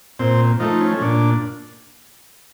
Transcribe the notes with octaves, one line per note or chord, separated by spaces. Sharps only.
A#2 C4
F3 A3 D#4
C#4
A#2 D4